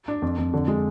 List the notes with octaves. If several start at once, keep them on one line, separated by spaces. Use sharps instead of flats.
D4
F2
F2
D3
G#3